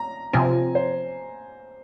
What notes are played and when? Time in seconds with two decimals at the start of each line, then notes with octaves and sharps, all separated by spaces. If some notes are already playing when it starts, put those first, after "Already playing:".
Already playing: A#5
0.33 C3 F3 C4 G#5
0.75 C5